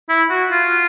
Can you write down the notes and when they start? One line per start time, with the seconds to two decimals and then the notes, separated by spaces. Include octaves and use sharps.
0.09 E4
0.30 F#4
0.49 F4